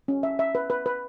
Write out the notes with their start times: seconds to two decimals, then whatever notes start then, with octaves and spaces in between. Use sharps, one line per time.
0.08 C#4
0.23 E5
0.39 E5
0.55 B4
0.70 B4
0.86 B4